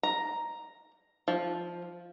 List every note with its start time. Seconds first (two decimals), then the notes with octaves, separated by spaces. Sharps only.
0.03 A#5
1.28 F3